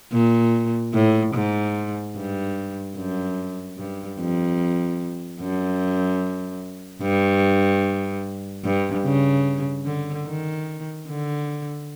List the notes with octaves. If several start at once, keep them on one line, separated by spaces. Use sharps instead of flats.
A#2
A2
G#2
G2
F#2
G2
F2
F#2
G2
G2
C#3
D3
D#3
D3